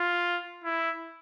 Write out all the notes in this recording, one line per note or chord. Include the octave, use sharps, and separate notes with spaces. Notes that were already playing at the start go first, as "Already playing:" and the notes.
Already playing: F4
E4